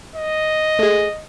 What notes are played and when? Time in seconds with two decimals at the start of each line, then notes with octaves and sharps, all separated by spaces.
0.16 D#5
0.79 A3 G#4